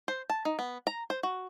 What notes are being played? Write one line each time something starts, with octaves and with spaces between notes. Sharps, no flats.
C5
A5
D#4
B3
A#5
C5
F#4